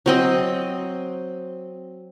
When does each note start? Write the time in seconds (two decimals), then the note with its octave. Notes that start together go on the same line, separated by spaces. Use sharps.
0.06 F#3 C4 D#5